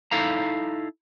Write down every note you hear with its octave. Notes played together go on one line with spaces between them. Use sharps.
D#4 E4 A4 F5 A#5